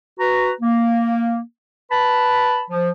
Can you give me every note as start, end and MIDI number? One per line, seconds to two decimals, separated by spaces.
0.19 0.51 66
0.19 0.51 71
0.19 0.51 82
0.61 1.39 58
1.91 2.63 71
1.91 2.63 81
1.91 2.63 83
2.71 2.90 53